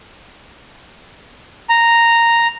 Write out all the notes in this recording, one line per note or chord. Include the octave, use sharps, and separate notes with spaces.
A#5